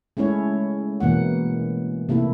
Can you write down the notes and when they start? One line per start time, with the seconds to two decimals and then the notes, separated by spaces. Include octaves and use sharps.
0.17 G#3 A3 C#4 E4 C#5
1.00 B2 E3 A#3 F#5
2.09 C3 A3 A#3 E4